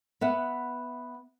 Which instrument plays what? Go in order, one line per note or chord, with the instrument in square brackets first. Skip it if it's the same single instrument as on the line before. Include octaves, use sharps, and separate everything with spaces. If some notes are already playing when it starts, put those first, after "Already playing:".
[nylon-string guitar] B3 E5 F#5